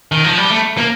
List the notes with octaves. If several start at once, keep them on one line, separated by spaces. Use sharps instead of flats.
D#3
F3
G3
A3
A#3